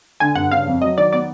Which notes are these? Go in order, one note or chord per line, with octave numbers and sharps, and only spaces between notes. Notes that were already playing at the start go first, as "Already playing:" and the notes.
D3 G#5
G2 F#5
C#3 F5
F2
F#3 D#5
D#3 D5
B3 D5